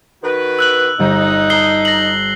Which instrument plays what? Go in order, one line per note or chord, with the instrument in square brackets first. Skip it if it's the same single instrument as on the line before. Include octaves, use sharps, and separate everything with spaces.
[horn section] D#3 F#4 B4
[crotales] E6 F#6 F#7
[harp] G1 G3 A6 [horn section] D#4
[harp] A5 A#5 D#6 [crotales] C7 G7
[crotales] A#6 F#7